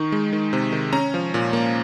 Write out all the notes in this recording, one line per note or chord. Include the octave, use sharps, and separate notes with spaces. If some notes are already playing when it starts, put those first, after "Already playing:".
Already playing: D#3 D#4 C#6
G#3
D#3
C3
D#3
C#4 A#5
F3
A#2
A#3